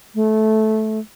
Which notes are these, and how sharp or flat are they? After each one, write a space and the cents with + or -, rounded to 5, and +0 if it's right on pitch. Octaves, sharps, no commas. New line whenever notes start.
A3 -15